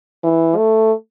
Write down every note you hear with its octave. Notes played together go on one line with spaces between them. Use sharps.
E3
A3